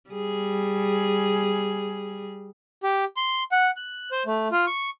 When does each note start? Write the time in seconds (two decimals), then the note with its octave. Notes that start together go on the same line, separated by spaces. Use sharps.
0.10 G3 G#4
2.83 G4
3.17 C6
3.52 F#5
3.76 F#6
4.12 C5
4.26 A3
4.52 F4
4.67 C#6